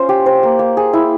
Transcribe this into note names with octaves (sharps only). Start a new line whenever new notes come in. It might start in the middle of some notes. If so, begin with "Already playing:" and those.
Already playing: C#4 F4 C5
G4
C5
A#3
A#3
G#4
E4